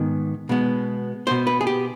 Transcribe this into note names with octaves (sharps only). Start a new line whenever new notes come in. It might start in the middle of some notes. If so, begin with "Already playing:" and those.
Already playing: G#2 D#3 B3
B2 G#3 B3
B2 B3 C5
B4
G#4
G4